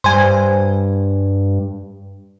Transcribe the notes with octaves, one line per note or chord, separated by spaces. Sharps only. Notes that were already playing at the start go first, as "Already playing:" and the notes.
G2 C5 G#5